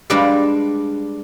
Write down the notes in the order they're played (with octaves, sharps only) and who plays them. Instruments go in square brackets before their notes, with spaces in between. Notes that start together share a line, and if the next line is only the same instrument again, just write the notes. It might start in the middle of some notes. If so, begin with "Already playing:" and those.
[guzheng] G3 G#3 D4 B4 D5 F5